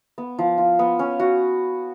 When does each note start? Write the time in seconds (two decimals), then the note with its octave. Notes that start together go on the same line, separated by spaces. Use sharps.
0.18 B3
0.39 F3
0.58 F4
0.79 B3
0.99 C#4
1.20 F#4